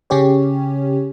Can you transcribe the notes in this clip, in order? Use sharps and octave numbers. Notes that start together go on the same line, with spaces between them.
C#3 C#4 G4 C#5